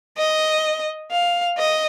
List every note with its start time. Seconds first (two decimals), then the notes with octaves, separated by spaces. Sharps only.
0.18 D#5
1.11 F5
1.58 D#5